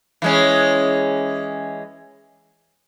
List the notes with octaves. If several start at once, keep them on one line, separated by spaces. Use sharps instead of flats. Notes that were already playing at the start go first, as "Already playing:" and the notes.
E3 G#3 C#4